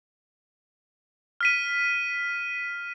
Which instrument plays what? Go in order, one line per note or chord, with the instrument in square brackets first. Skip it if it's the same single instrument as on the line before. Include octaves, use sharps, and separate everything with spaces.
[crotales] F6 B6 D#7